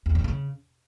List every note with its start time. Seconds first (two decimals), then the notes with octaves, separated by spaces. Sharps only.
0.06 E2
0.15 D3
0.24 C#3